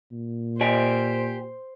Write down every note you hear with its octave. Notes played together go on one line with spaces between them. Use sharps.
A#2
G4 C5 D5 G#5